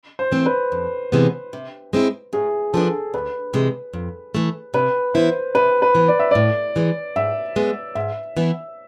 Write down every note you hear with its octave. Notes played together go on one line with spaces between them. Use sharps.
C5
E3 A3 C4
B4
F2
C3 E3 G#3 B3
C3
G#3 C4 E4
A2 G#4
F3 B3 D4 A4
D2 B4
C3 E3 G#3
F2
E3 A3
C3 B4
E3 B3 E4 C5
C3 B4
B4
E3 B3
D5
E5
A2 D5
E3 G#3
G#2 E5
G#3 B3
G#2 E5
E3 B3 E4